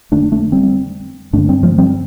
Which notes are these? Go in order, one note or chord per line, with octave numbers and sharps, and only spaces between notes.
F2 D3 A3 D4
A3 D4
G3 C4
G2 D3 A3 D4
G3 C4
F3 A3
G3 C4